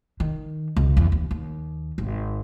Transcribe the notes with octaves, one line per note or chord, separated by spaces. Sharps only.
D#3
C#2
E2
D#2
D#2
G#1